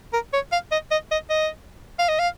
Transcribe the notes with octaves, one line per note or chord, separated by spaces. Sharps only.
A#4
C#5
F5
D#5
D#5
D#5
D#5
F5
D#5
F5